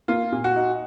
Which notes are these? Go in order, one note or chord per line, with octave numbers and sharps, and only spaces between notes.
A#3 F4
A#2
F#4
D#4